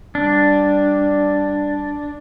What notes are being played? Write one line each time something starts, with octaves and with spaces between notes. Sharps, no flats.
G3 D4